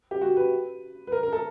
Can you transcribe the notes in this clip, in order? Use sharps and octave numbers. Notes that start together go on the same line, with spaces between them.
G4
F#4
B4
B4
A#4
A#4
A4